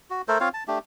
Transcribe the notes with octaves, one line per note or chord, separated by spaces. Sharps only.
F#4
A3 A4 A#4 C5
C4 F4 C#5 F5
A5
A3 D4 G4